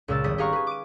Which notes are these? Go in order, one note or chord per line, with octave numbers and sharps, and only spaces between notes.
C#2 A#2 C#3 E6 A6
G#1 G3 C4 D#6 B6
G4 G#4 F5 F#5 A#5 C#6
G#4 B4
D6 D#7